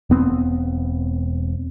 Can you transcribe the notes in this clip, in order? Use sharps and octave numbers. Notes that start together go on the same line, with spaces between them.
E1 B3 C4